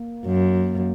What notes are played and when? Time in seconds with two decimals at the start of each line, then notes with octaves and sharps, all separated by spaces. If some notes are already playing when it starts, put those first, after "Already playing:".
Already playing: A#3
0.26 F#2